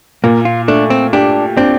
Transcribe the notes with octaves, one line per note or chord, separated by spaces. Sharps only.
A#2 A#3
F4
A3 D4
C4
D4 G4
C4 D4